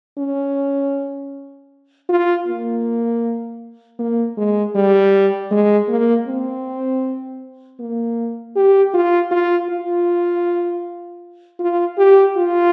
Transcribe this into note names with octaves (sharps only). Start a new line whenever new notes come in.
C#4
F4
A#3
A#3
G#3
G3
G#3
A#3
C4
A#3
G4
F4
F4
F4
F4
G4
F4